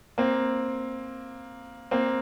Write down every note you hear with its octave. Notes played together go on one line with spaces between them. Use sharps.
A#3 C4
A#3 C4